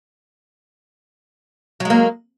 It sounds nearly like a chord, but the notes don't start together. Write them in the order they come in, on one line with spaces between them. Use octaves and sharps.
F#3 G#3 A#3